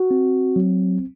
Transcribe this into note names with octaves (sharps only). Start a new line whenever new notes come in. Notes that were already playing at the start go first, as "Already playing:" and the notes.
Already playing: F#4
C4
F#3